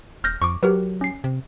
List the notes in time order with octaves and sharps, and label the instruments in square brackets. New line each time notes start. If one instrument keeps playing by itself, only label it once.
[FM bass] D#1 [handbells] F6 G6 A#6
[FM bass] F2 [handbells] C#6 D6
[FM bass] F#3 [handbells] G4 A#4 B4
[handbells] C#4 C7
[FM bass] C3